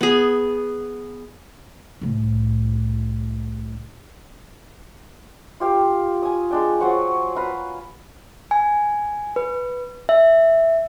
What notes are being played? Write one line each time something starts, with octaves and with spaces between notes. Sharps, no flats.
B3 G#4
C2 A2
F4 G4 F5 D6
G#5 D#6
G#3 D4 G5
F#3 C5 C#5 F#5
B4 F5 A#5
G#5
B4
E5